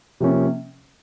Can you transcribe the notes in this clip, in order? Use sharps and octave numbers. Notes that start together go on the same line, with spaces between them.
C3 F3 A#3 C#4